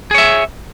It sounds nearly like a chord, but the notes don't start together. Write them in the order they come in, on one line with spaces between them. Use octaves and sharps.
G#4 C#5 E5